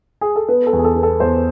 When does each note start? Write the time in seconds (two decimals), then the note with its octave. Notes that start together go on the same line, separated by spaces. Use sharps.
0.21 G#4
0.36 A4
0.48 B3 B4
0.67 A4
0.73 E2
0.79 G#4
0.84 A4
0.96 B3
1.03 A4
1.20 E2 C5